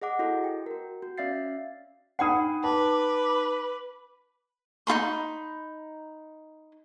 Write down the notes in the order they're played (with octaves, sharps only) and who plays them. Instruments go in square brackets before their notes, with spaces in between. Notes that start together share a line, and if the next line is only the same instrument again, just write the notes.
[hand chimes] G#4 D#5 F#5 D6
E4 F#4 A4 D#5
G5
F#4 A#4
F#4
C#4 D5 E5 F5 A6 C7
[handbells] D#4 G5 C7 [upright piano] F#5 B5 D#6
[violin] B4 [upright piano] A5 [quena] D6
[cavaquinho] D#4 F4 B5 C6